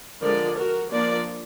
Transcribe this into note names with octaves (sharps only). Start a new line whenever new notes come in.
D3 F3 G#3 A#4 D5
F#4 A#4
F3 A#3 D4 A#4 D5